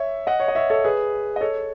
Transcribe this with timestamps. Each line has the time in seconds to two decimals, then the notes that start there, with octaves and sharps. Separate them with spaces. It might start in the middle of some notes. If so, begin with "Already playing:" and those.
Already playing: C#5 E5
0.27 D#5 F#5
0.40 C#5
0.48 D#5
0.55 C#5 E5
0.70 A4 C#5
0.84 G#4 B4
1.36 D#5
1.41 A4 C#5